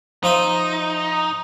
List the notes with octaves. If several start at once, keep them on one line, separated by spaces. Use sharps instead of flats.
F3 D#4 F4 E5